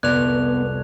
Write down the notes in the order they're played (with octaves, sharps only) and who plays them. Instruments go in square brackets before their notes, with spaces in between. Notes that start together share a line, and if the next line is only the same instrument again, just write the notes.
[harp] C2 F2 C3 [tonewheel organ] B3 [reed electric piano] D5 G#6 [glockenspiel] F#6 F7